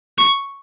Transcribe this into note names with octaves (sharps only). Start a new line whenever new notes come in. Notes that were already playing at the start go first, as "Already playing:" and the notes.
C#6